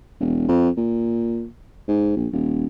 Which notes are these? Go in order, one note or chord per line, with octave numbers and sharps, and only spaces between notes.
E1
F2
A#2
G#2
A#1
D#1